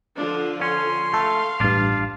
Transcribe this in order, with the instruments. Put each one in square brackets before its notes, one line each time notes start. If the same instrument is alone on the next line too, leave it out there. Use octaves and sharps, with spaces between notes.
[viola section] D3 F3 F4 [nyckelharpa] D4
[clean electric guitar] C#4 [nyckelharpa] C6
[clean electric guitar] A3 [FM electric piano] A4 [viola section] F5
[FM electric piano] A1 G2 [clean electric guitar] D4 F4